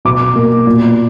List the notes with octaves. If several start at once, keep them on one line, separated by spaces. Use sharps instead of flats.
B2 D6
A#3
A#2